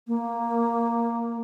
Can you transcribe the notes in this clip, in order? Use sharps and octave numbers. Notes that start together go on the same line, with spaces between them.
A#3